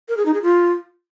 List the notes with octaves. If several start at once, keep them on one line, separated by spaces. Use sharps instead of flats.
A#4
G#4
D#4
G#4
F4